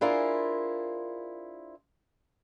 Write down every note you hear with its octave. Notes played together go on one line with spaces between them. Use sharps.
D4 E4 F4 G#4 A#4 C5